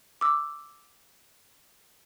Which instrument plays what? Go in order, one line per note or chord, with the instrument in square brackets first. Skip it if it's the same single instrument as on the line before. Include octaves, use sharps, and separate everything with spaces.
[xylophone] D6 E6